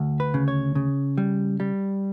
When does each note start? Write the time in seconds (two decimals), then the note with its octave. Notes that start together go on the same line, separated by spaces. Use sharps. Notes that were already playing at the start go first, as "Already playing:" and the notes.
Already playing: D2
0.20 B4
0.34 C#3
0.48 C#5
0.75 C#3
1.18 G3
1.60 G3